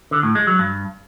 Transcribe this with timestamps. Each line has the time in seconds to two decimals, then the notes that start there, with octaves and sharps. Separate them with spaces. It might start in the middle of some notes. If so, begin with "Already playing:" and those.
0.11 D3
0.23 A2
0.35 G#3
0.47 F#3
0.59 G2